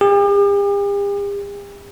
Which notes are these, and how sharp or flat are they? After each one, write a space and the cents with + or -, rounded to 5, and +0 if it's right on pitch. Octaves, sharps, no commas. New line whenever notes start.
G4 +45